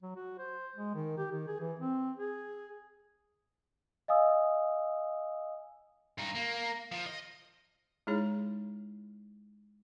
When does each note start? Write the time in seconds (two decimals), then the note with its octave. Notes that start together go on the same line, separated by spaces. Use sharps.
0.03 F#3
0.16 F#4
0.38 C5
0.76 G#3
0.95 D#3
1.18 G4
1.32 D#3
1.48 G#4
1.60 E3
1.80 C4
2.17 G#4
4.08 D#5 F5 G#5 D#6 E6
6.18 G2 D#4
6.35 A#3
6.92 F3
7.06 D#5
8.07 G#3 D#4 E4 G#4 C#5